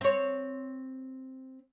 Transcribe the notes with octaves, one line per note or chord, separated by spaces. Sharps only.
C4 C#5